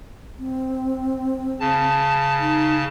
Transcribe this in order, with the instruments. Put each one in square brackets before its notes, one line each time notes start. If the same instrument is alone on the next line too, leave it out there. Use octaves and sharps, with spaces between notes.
[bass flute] C4
[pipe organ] C#3 A5
[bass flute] D#4